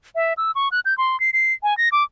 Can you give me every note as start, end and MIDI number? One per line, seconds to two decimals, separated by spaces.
0.15 0.34 76
0.37 0.51 88
0.55 0.69 85
0.72 0.80 90
0.85 0.96 91
0.98 1.19 84
1.20 1.30 96
1.33 1.53 96
1.63 1.76 80
1.77 1.89 94
1.92 2.04 86